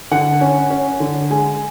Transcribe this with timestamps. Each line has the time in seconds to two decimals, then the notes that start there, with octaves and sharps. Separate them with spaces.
0.11 D3 F#5
0.41 C#4
0.70 C#4
1.00 D3
1.30 G#3 G#5